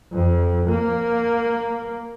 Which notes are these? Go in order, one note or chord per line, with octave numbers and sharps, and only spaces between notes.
F2
A#3